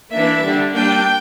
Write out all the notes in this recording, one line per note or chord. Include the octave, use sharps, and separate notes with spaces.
E3 A#3 D4 E5
D3 G3 D4
G3 A#3 D4 G5